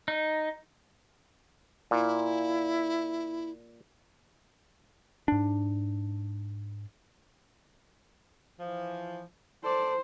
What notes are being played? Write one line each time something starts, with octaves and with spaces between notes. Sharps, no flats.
D#4
A#2 E4
G#2 D4
E3 F3
A4 C5 D5